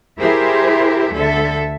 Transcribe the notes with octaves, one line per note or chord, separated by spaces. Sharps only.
E4 G4 G#4 A#4 C5 E5
D2 D3 A4 E5